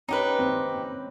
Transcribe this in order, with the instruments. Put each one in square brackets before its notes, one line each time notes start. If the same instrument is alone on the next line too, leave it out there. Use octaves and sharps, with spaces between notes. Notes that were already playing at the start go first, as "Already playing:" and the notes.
[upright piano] C#4 [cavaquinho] D#4 G4 B4
[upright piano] C4